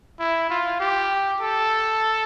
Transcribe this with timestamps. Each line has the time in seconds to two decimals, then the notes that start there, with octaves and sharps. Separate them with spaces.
0.20 E4
0.50 F4
0.80 G4
1.41 A4